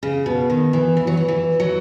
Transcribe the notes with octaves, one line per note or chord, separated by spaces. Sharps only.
C#3
B2
D#3
E3
E3
F#3
E3
E3
F#3